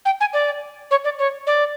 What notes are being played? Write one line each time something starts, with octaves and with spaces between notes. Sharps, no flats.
G5
G#5
D5
C#5
D5
C#5
D5